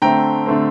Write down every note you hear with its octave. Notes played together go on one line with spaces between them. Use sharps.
D3 A3 C4 G5 A#5
D3 A3 C4